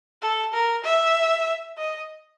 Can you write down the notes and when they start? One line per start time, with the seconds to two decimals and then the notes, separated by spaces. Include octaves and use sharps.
0.22 A4
0.54 A#4
0.85 E5
1.77 D#5